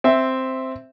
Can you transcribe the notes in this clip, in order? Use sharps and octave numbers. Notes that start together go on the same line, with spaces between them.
C4 E5